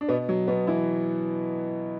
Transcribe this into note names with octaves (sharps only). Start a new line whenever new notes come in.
D4
B2 B3
F#3
B2 B3
E3 E4